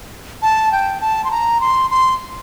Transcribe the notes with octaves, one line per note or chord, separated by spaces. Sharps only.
A5
G5
A5
C6
A#5
C6
C6